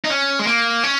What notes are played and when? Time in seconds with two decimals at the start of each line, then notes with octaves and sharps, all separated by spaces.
0.05 D#4
0.10 C#4
0.39 G#3
0.47 A#3
0.83 C#4